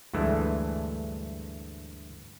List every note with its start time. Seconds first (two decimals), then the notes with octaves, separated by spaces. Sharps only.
0.13 D2 G2 E3 G#3 A3